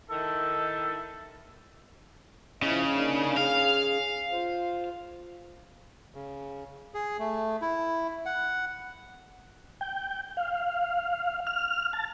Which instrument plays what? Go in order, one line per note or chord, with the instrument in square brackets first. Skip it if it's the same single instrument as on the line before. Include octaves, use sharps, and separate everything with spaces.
[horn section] D#3 E4 A4
[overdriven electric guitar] C#3 [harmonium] F3 E4 D#5
[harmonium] A#3 D4 D#4
[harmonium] C#4 G#4 [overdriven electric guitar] F5
[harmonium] F4 C5
[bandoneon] C#3
G#4
A3
E4
F#5
[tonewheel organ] G5
F5
F6
A5